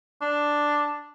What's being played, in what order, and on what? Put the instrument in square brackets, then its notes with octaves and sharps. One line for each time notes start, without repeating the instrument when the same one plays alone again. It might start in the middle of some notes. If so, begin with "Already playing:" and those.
[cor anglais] D4